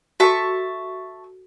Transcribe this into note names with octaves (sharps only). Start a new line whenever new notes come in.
F#4 A4 E5 A5 C#6